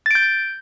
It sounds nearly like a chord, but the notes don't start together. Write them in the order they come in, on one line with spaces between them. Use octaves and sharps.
A6 D7 G6